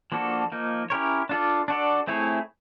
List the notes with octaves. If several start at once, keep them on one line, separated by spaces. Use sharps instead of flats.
F3 A#3 D4 F#4 A4
F3 A#3 D#4
C#4 E4 G4 A#4 C#5
D4 F4 A4 D5
D4 F#4 A4 D5
A3 C4 E4 G#4 C#5